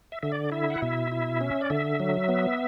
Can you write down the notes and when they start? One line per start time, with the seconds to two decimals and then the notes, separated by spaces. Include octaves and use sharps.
0.12 E5
0.23 D3 E5
0.32 D5
0.52 E4 E5
0.70 F#5
0.82 B2 E5
1.12 E4
1.41 C#4
1.61 D5
1.70 D3 E5
2.00 F#3
2.29 B3